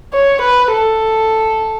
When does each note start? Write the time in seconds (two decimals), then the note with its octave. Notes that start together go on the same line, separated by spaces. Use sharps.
0.13 C#5
0.41 B4
0.72 A4